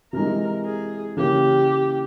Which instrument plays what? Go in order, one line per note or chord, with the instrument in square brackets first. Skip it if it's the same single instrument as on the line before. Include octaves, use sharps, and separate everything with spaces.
[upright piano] C3 E3 G#3 [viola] A#4
[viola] G#4
[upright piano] C#3 E3 A#3 [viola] G4